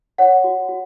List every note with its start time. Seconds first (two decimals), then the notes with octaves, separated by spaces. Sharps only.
0.18 C#5 F#5
0.44 F#4
0.69 F#4